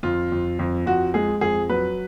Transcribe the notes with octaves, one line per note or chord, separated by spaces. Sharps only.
F2 F4
F2
F2
F2 F#4
G#3 G#4
F2 G#4
F#3 B4